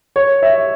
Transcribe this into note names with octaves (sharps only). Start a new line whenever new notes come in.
C#5
E5